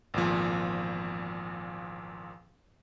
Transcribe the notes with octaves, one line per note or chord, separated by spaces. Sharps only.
G#1 E2 A#2 F3